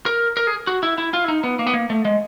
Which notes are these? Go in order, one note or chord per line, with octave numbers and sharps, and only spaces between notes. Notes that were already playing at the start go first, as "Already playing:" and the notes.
A#4
A#4
G#4
F#4
E4
E4
F4
E4
D#4
B3
A#3
B3
A#3
A3
G#3